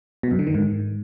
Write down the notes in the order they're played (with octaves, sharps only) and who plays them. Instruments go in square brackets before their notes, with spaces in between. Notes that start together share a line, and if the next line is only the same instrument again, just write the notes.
[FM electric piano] B2
F#2
D3
D#3
G#2